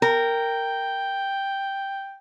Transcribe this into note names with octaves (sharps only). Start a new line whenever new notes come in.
A#4 G5